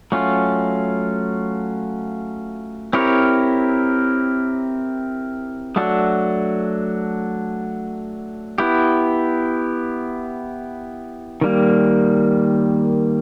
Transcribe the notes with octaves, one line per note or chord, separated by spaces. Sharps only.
F#3 A3 C#4 F4
C4 E4 G4 A#4 C#5
F#3 A3 D4 F#4 A4
B3 E4 G4
D#3 G3 A#3